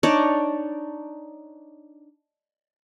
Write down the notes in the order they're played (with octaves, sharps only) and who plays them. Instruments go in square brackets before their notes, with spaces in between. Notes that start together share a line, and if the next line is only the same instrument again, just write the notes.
[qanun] D4 D#4 C#5 D5